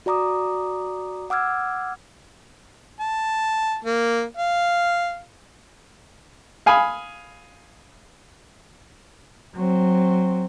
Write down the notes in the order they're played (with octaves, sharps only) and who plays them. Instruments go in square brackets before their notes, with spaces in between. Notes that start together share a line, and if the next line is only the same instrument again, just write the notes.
[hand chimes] F#4 D5 A#5 D6 D#6
F#5 D6 E6 F6 G#6
[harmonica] A5
A#3
F5
[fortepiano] F5 G#5 B5 D#6
[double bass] F#3 C4